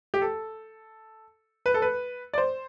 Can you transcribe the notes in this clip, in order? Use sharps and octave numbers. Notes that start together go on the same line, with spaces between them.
G4
A4
B4
A4
B4
D5
C5